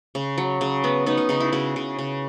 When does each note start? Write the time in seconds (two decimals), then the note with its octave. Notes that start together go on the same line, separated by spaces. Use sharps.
0.15 C#3
0.38 F#3
0.61 C#3
0.84 B3
1.06 B3 D#4
1.17 C#4
1.29 C#3 D#4
1.40 E4
1.53 C#3 F#4
1.76 C#3
1.99 C#3